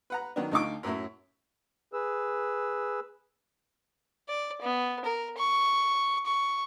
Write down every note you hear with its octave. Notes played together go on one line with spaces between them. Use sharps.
B4 F#5 A#5
D#3 F#3 B3 D4
D2 D3 D#4 F4 C#6 D6
F#2 A2 F#3 E4
G#4 B4 E6
D5
B3
A#4
C#6
C#6